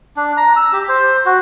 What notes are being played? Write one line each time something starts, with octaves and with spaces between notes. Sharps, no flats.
D4
A#5
E6
G4
C5
F#4